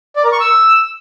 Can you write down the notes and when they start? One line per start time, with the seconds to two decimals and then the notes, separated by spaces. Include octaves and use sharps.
0.16 D5
0.24 A#4
0.32 C#6
0.40 E6